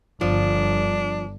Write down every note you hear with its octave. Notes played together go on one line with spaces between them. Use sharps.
G1 F3 D4